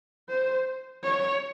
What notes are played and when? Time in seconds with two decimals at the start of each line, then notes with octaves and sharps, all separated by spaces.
0.29 C5
1.03 C#5